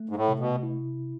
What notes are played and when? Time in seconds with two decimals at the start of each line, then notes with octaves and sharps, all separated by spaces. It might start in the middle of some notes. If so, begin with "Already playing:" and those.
Already playing: A3
0.09 G#2
0.16 A2
0.28 C3
0.39 B2
0.63 E4